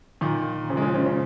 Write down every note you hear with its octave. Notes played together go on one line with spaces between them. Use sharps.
A#2 D#3
C#3 F3
G#3
C#3 F3
C#3 F3
C#3 F3